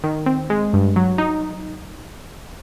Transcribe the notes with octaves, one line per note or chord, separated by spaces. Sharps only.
D#3
C4
G#3
G2
F#3
D#4